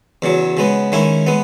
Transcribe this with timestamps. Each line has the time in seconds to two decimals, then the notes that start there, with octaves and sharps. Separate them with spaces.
0.22 E2 C#3 F#3
0.57 C#3 G#3 B3
0.92 D#3 G#3 C#4 E4
1.27 G#3 B3